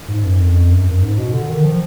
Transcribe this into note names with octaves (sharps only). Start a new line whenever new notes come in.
G#2
F#2
F2
F#2
F#2
G#2
B2
D3
D#3
F3